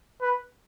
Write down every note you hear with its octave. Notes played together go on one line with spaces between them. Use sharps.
B4